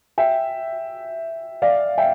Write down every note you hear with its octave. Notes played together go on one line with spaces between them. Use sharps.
E5 G5
D5 F5
E5 G5